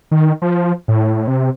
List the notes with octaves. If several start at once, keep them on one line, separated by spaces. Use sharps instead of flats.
D#3
F3
A2
C3